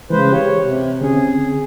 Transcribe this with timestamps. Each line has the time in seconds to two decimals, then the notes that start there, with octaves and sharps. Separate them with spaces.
0.10 C#3 E3 G#3 B4 C5
0.32 G4 C#5
0.62 C3
1.01 D3 C4 C#4 G#4